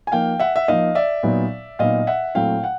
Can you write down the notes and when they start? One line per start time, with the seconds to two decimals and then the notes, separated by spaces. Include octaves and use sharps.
0.07 G#5
0.12 F3 A#3 D#4 F5 G5
0.39 E5 F#5
0.56 E5
0.68 F3 A#3 D#4 D#5 F5
0.95 D5 E5
1.23 A#2 F#3 B3 D#4
1.79 A#2 F#3 B3 D#4 D#5 F5
2.07 E5 F#5
2.35 A#2 F#3 A3 C4 E4 F5 G5
2.64 F#5